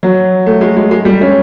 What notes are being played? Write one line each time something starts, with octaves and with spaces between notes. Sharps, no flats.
F#3
A3
G#3
G#3
G#3
G3
C#4